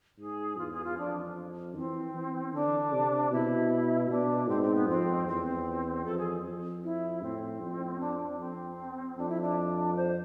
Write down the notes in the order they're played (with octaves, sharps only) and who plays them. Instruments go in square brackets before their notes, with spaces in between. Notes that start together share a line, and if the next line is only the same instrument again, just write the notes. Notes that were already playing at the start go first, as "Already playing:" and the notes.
[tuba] G#2 [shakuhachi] G#4
[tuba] E2 [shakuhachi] F4
[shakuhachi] G#4
F4
[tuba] F2 [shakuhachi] D4
[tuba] E3 [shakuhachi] C4
[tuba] E3
[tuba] D3 [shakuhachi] D4
[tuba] C3
[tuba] B2 [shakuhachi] E4
[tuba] B2 [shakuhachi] D4
[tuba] G#2 [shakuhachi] C4
[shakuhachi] C4
B3
[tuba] F2 [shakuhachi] C4
[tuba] E2 [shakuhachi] C4
[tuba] F2 [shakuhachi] A4
[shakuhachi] G#4
[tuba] F2
[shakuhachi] E4
[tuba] A2 [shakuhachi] C4
[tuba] F2
[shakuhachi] D4
[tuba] F2 [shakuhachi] C4
[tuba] F2 [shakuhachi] D4
[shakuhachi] E4
D4
C5